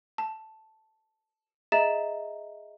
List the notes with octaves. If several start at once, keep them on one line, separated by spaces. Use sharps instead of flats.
A5
G#4 D#5 E5 A#5 A6 E7